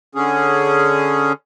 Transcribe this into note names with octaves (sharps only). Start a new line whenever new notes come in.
D3 C#4 G#4